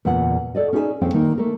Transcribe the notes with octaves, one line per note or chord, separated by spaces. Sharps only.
E2 A#2 C#3 F4 F#5
A4 D5 D#5
C#4 D#4 G#4 B4 E5 G#5
F2 A#2 C4 C#4 F5 G5
D#3 A#3 D#4
A3 A#3 A#4